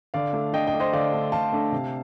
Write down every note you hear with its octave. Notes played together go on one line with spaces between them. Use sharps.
D3 D5 F5
A3 D4
D3 D#5 G5
D#5 G5
A3 D4
C5 D#5
D3 D5 F5
A3 D4
D3 F5 A5
A3 D4
C3